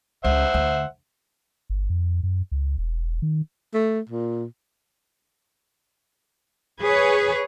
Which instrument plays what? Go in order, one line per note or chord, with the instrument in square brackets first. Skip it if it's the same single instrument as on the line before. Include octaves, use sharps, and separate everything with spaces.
[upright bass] C#2 [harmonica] C5 E5 F#5
[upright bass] D2
[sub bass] G1
F2
F#2
C#2
E1
D#3
[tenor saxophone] A3
A#2
[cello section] G#4 B4 C#5